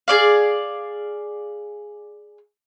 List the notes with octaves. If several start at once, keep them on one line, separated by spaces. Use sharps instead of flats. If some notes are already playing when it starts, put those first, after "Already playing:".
G#4 D5 F5